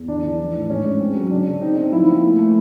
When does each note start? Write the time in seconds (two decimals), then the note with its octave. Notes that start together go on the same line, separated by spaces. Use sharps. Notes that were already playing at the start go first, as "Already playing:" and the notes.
Already playing: E2
0.08 E3 D4
0.23 E3
0.38 F3
0.54 A2
0.69 G#2 C#4
0.84 G#3
1.00 C4
1.15 F#3
1.30 C#3 D4
1.46 C#3
1.61 C4 D#4
1.77 C4
1.92 F3 E4
2.08 A#3
2.23 A3
2.39 A3